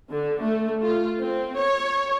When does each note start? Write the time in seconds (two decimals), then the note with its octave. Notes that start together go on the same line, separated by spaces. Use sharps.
0.11 D3
0.42 A3
0.83 F4
1.20 C4
1.58 C#5